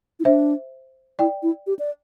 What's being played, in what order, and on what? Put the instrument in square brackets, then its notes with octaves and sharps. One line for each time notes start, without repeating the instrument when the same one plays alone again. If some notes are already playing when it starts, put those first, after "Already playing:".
[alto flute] E4
[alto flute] D4 [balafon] C5 E5
[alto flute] E4 [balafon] D5 G5
[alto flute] E4
G4
D5